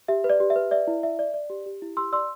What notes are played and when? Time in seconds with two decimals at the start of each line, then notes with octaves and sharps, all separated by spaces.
0.08 G4 E5
0.24 B4
0.30 D5
0.40 G4
0.50 E5
0.56 B4
0.71 D5 E5
0.87 E4
1.03 D5 E5
1.19 D5
1.34 D5
1.50 G4
1.66 G4
1.82 E4
1.97 G4 C6 E6
2.12 D5 C6 E6